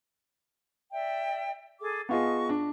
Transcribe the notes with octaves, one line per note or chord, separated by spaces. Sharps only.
D5 E5 G5
G#4 A4 D6
B3 F4 G#4 D#5 A5 C#6
D4